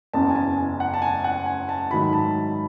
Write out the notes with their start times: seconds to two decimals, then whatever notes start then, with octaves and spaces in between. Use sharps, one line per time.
0.13 F#1 E2 C#3 A5
0.30 G#5
0.36 A5
0.57 G#5
0.80 F#5
0.94 A5
1.02 G#5
1.24 F#5
1.46 G#5
1.69 A5
1.90 G#2 D#3 F#3 A3 B5
2.13 A5